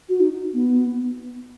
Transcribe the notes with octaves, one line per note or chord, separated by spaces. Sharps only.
F#4
D#4
B3